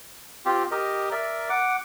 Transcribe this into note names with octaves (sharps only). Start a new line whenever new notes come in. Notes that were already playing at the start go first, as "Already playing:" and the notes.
C4 F4 G4
G4 A#4 D#5
A#4 D5 E5
F#5 D6